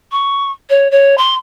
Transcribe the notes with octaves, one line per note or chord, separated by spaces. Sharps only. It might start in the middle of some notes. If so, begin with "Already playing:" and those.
C#6
C#5
C#5
C6